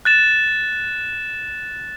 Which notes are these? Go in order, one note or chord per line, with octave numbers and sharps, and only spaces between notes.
F#6 A6 E7